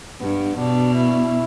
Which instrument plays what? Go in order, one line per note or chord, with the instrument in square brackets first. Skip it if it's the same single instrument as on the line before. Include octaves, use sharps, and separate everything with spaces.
[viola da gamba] G2 [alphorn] B3
[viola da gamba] B2 [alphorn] D4
[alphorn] E4